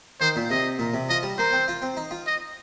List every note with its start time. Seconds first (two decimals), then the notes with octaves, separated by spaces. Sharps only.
0.21 D#3 C5
0.36 A#2
0.50 C3 D#5
0.79 A#2
0.94 C3
1.09 F3 D#5
1.23 G3
1.38 A#3 C5
1.52 C4
1.68 F4
1.82 C4
1.97 D#4
2.11 F4
2.27 D#5